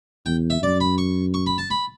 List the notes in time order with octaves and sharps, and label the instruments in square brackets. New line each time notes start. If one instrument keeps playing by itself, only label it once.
[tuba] E2 [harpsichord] G5
[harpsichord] E5
[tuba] F#2 [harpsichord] D5
[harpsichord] B5
C#6
C#6
B5
A5
B5